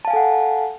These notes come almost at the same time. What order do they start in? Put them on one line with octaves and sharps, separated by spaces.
A5 F5 G#5 A4 F#5